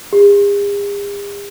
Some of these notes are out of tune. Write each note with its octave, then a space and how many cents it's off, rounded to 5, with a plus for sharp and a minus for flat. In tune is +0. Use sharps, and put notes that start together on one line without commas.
G#4 -45